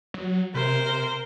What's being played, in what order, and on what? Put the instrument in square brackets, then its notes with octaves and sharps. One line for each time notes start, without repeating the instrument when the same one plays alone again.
[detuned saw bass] F#3
[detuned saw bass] C3 [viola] A#4 C5